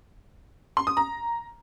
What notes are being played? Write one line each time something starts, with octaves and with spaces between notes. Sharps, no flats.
C6
D#6
A#5